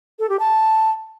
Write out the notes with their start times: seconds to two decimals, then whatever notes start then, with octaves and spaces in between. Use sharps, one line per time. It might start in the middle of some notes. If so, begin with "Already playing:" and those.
0.19 A4
0.29 G4
0.39 A5